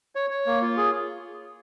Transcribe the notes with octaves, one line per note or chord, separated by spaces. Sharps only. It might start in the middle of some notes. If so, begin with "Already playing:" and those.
C#5
C#5
A#3
F4
G#4